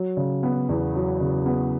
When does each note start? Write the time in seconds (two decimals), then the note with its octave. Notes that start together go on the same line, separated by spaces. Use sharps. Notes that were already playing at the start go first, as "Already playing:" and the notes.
Already playing: F#3
0.17 C#3
0.43 B3
0.69 E2
0.95 F#3
1.20 C#3
1.46 B3